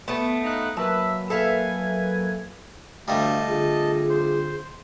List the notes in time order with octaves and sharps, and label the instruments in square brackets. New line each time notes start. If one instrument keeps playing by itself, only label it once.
[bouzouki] A3 B3 A5
[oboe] D#4 [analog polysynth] F5 F#6
[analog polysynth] F#3 A#3 B4 [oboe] E5 [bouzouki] A5
[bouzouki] A4 E5 F5 [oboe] G#5
[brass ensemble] D2 [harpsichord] G3 A3 [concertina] D#5 A5 [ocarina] F5
[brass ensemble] D3 C4 F4 [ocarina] G#4
[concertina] C5